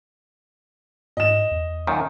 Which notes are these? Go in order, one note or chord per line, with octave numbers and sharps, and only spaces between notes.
G#2 D#5 E7
E2
F#2 A#2 D#3